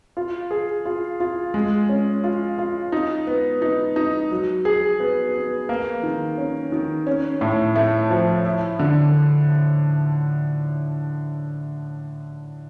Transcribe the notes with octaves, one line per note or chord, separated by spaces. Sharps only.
F4
G#4
F4
F4
G#3
C#4
F4
F4
D#4
B3
D#4
D#4
F#3
G#4
B3
B3
A#3
D#3
C#4
D#3
C#4
A2
A3
F3
E4
D3